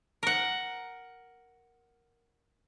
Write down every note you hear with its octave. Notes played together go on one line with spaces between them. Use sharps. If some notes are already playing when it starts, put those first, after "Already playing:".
A#4 F#5